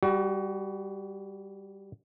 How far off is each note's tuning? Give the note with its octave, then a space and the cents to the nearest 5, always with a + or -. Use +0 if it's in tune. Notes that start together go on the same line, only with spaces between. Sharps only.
G3 +5 F#4 +30